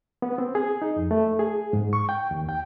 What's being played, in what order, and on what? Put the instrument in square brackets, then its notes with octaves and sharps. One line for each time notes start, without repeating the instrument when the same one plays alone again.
[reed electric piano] B3
C4
G#4
D#4
F2
A3
G#4
G#2
C#6
G5
D#2
G5